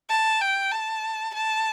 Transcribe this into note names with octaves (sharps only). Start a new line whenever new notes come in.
A5
G5
A5
A5